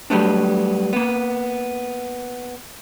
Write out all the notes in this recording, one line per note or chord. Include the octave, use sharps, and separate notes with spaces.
F#3 G3 A3 B3 D4
A#3 B3